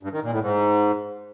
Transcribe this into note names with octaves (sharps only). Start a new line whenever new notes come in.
G2
D#3
A#2
A2
G#2